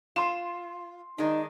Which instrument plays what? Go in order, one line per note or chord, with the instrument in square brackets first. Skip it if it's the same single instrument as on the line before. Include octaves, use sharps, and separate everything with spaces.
[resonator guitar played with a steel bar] F4 [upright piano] C6 E7
[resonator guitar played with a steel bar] D#3 G#3 D4 [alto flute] D#4